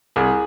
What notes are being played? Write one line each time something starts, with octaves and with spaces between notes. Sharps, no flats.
C2 G#4